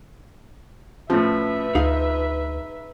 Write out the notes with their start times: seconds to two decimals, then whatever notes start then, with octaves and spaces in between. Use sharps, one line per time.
1.10 A2 F3 C#4 B4 E5
1.75 D2 D#4 G#4 F5